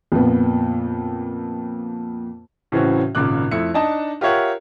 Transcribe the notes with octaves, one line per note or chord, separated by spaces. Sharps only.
F2 A#2 B3
A2 C#3 E3 C4 C#4 F#4
G#1 A#2 C#3 D6 F#6
F2 A3 E4 C#7
D4 D#4 D#5 A5
F4 G4 A#4 C#5 E5 F#5